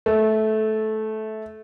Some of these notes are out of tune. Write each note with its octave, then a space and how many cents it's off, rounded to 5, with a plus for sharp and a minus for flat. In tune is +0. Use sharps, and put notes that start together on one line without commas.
A3 -15